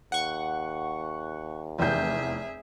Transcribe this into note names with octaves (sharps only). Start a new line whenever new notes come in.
D#2 F#5 C#6
F1 E2 G#4 E5 G6